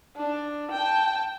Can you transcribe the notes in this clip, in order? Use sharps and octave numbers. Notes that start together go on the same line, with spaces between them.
D4
G5 A5